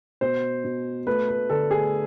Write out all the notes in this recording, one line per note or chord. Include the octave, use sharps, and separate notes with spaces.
B2 C5
B2
A3 B4
B4
D3 A4
G#4